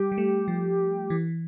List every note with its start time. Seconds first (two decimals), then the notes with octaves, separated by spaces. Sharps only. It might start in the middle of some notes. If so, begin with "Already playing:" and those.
Already playing: G3 G4
0.12 G3
0.18 A3
0.48 F3
1.10 E3